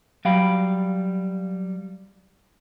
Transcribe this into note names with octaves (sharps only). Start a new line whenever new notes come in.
F#3 G3 F5 G5 B5